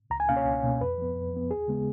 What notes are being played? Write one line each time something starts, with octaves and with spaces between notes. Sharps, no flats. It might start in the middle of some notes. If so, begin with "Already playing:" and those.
C#2 A#5
G#5
B2 A#3 C#4 F5
C#5
C#2
B2 A#3 C#4
F2 B4
F3 B3
F2
F3 B3
D#2 G#4
C#3 G#3 B3